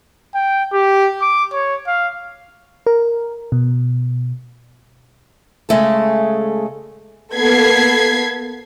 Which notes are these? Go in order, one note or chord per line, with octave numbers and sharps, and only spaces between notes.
G5
G4
D6
C#5
F5
A#4
B2
C#3 G#3 A3 A4
A#3 B3 A4 G#6 B6 C7